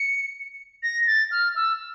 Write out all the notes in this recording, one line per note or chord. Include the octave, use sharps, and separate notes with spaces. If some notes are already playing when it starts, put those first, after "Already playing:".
Already playing: C#7
A#6
A6
F6
E6